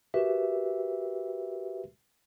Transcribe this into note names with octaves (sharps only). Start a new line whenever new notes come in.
F#4 G4 A#4 B4 E5